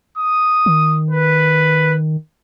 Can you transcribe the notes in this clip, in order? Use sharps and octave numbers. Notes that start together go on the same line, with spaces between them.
D#6
D#3
B4